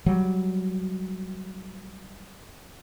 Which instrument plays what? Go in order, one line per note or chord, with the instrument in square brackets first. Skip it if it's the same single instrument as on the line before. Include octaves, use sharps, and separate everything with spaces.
[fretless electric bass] F#3 G3